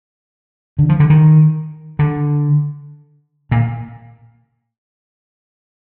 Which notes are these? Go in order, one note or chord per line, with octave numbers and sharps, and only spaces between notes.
D3
F3
D3
D#3
D3
A#2